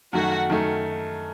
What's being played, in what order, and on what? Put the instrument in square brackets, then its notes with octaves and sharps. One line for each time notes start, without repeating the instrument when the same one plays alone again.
[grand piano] F#2 D#3 A3 [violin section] F#4
[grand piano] F#2 D#3 A3